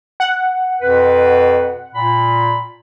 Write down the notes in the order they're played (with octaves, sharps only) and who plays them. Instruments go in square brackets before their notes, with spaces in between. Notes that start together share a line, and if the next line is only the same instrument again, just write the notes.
[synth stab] F#5
[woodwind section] F2 B2 B4
A#2 B5